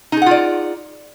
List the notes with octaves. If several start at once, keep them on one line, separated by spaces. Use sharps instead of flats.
D#4 F4 G#4 D5 F#5